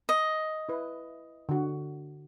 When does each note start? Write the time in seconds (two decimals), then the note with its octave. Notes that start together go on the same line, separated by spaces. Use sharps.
0.09 D#5
0.69 E4 B4
1.49 D3 F#4